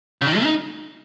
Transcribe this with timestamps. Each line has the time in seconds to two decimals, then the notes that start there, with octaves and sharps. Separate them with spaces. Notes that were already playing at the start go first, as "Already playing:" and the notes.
0.22 C#3
0.27 D#3
0.36 A3
0.45 D#4